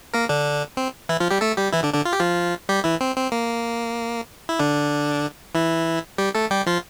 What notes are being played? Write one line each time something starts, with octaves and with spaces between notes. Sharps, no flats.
A#3 A#4
D3 D4
C4
E3 E4
F3 F4
G3 G4
A3 A4
G3 G4
E3 E4
D3 D4
D3 D4
F4
G4
F3 F4
G3 G4
E3 E4
C4
C4
A#3
E4
D3 D4
E3 E4
G3 G4
A3 A4
G3 G4
F3 F4